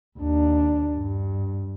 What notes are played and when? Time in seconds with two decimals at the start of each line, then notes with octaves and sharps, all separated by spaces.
0.18 D#2 D4
0.95 G2